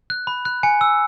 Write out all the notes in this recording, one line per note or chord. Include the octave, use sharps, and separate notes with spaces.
F#6
B5
F#6
G#5 C#7
E6